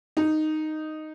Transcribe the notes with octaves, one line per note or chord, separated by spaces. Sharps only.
D#4